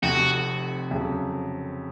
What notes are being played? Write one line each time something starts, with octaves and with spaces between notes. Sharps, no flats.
F1 F2 C3 F#4
F2 C#3 F#3